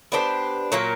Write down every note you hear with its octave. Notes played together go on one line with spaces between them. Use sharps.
B3 D4 G4 C5
A#2 F#3 A#3